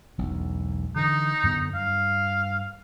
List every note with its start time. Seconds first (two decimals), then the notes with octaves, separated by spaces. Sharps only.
0.18 E1 B1
0.96 D3 E3 D#4
1.43 F#2 D3 B3
1.74 G2 F5